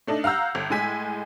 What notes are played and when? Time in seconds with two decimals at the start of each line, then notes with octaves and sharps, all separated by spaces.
0.07 A3 D4 D#4 A4
0.24 F5 F#5 A#5 E6 G6
0.55 G1
0.70 A2 G#3 G#5 B6